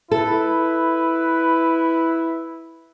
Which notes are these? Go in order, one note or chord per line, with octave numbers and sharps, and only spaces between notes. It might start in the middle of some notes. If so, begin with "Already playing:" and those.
E4 A4 B4